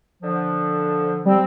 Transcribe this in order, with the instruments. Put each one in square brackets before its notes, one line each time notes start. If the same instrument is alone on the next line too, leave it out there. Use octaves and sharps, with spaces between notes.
[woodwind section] D3 F3
[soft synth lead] G3 [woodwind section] C4